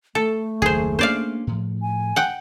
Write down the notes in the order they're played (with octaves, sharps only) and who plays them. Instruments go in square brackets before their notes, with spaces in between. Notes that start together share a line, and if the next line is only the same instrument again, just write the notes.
[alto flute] A3 [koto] A4
[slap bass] F#1 D#2 [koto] G#4 C5
[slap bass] A#3 C#4 D4 [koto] C5 D5 F5
[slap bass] A2 F3
[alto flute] G#5
[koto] F#5 G5